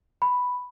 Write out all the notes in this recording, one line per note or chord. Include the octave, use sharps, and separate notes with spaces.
B5